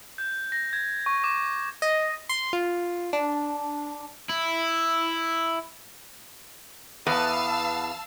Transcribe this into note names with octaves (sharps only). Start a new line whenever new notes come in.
G6
A#6
G#6
C#6
D6
D#5
C6
F4
D4
E4
E2 B3 B4 F5 A5 E6